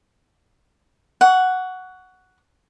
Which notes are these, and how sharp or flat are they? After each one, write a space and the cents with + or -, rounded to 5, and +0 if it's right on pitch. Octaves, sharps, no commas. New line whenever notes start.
F#5 +0 C#6 +25